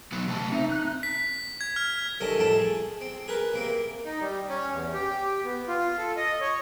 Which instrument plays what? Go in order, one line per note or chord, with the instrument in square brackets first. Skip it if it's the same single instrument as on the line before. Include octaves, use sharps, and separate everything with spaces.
[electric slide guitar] F#3 B3 D#4
C3 A3 A5
[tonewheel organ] C4 E5 [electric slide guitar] D#4
[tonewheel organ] F#6
[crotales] B6
G#6
F6
[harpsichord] C2 C3 D#3 C#4 A4 D#5
C2 F2 A2 C4 A4 A5
G#4
C4
G#4 A#4 B4
C3 A#3 C4
[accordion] D#4
G3
C#4
E2
G4
B3
F4
A4
D#5
C#5